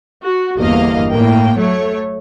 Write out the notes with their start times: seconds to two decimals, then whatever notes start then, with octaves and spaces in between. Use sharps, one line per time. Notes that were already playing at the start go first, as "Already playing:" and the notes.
0.24 F#4
0.58 G1 E2 A#3 D#5 F5
1.11 A2 A#3 G5
1.58 F#3 A3 C#5